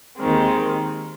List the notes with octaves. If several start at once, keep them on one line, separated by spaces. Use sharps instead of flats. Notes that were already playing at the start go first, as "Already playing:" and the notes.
D#2 D#3 G#3 C4